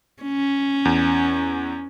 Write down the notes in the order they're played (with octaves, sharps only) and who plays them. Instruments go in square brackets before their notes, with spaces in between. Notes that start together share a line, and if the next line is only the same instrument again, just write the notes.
[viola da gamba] C#4
[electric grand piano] E2